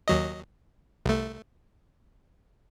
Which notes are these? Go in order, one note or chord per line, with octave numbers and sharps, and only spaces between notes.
D#2 F#3 D#5
C2 A3